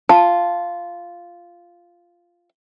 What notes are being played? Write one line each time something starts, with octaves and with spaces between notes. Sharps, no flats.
F4 A5